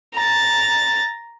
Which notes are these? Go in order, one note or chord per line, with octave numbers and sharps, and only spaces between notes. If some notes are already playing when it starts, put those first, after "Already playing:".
A#5 A6